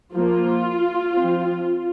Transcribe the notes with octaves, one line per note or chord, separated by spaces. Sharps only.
F3 A#3 F4
F3 C4